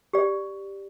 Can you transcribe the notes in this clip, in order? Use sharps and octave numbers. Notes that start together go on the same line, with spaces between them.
G4 D5